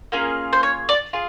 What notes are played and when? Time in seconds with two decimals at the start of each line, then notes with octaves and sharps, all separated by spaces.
0.12 A#3 C#4 F4 G#4
0.53 C5
0.63 C#5
0.89 D5
1.13 F4 G#4